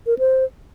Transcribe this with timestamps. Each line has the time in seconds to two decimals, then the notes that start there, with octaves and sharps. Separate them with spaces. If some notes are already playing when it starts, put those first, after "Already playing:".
0.07 A#4
0.19 C5